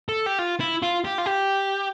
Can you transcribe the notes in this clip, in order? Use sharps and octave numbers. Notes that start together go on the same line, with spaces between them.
A4
G4
F4
E4
F4
G4
F4
G4